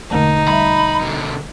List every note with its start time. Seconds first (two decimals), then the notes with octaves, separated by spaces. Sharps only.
0.11 E1 D3 A3 A#3 D#4 A5
0.48 G3 E5 B5
1.01 B2 D3